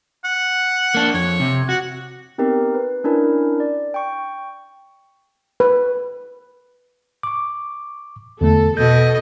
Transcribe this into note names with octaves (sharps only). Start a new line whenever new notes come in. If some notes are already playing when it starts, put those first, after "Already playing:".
F#5
A#3 D4
F2 C#5
C3
F#4 F#5
B3 C4 D#4 G4 A#4
B4
C#4 D4 E4 A#4
D5
G5 C#6
B4
C#6 D6
E2 D3 A3 A4
B2 A4 D#5 G6